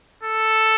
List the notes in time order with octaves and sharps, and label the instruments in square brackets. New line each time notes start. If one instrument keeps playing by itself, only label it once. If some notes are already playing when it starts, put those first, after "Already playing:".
[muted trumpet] A4